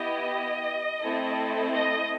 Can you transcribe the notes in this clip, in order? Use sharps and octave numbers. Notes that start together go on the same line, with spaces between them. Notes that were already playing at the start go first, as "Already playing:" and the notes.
Already playing: B3 E4 G4 D#5
A3 C4 E4 A4
D#5